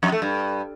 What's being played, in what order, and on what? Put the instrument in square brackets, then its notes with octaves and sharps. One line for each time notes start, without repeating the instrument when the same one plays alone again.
[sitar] F2
A3
G2